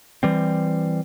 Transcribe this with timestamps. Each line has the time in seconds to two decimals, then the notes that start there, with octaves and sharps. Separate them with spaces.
0.23 E3 G3 C4